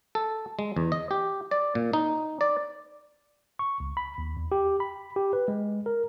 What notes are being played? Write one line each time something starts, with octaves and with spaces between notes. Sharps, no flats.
A4
G#3
E2
D#5
G4
D5
A#2
D#4
D5
C#6
C#2
B5
D#2
E2
G4
B5
G4
B4
G#3
A#4